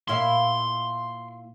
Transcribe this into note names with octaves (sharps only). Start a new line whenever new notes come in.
A#2 E4 F5 C6